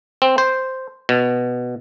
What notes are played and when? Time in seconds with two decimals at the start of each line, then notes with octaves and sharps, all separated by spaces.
0.22 C4
0.38 C5
1.09 B2